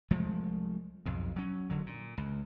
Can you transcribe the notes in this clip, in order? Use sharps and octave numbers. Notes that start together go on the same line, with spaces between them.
C2 F3 G#3 A3
B1 F2 G#2
F#3 C#4
F#1 D3 F#3
A#2
C#2